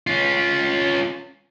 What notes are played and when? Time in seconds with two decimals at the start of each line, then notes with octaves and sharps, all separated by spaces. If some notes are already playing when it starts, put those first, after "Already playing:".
0.07 C#4 F4